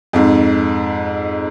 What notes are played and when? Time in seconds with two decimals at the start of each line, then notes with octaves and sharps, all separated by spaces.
0.13 F2 G#2